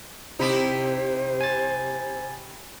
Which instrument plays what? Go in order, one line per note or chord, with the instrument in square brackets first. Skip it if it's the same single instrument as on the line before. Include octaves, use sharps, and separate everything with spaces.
[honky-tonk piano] C3 [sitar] D#4 E4 G4 [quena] C5
[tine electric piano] G#5 A6